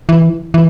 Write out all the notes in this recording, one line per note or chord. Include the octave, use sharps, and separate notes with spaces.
E3
E3